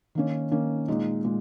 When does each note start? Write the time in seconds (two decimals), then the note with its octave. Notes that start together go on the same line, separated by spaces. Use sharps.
0.15 D#3 A#3 C#4
0.51 D#3 A#3 C#4
0.88 A#2 G#3 D#4
1.24 A#2 G#3